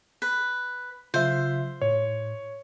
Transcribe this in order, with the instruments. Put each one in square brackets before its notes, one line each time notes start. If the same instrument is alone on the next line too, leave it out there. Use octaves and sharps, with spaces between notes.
[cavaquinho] B4
[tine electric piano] C#3 F#3 [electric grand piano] F4 E5 [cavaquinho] C5
[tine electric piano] A2 [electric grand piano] C#5